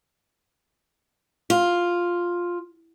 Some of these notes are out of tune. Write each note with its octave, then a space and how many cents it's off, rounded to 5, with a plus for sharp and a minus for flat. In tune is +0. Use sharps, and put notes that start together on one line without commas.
F4 +5